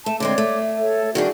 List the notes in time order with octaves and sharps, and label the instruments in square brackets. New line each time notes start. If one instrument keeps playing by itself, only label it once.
[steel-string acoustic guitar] A3 [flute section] A5
[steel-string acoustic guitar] D3 G#3 C4 [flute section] C#5 D5 D6
[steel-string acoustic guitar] A3
[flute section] A4 C#5
[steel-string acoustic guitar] D#3 G3 D4 [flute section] F#4 G#4 D5